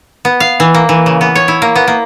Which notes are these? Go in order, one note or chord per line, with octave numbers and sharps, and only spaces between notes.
B3
F5
E3
A#3
E3
C#3
B3
C#5
E4
A#3
B3
A#3